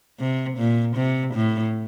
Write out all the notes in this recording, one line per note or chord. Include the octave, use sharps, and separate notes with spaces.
C3
A#2
C3
A2